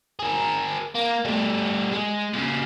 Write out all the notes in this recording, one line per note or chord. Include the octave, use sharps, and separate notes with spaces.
G#4 A#4
A#3
G3 A3
G#3
A#2 C#3